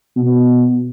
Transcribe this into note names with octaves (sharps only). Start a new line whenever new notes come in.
B2